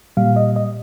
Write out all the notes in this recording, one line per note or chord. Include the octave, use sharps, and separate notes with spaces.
A#2 G3 F5
D#5
D#5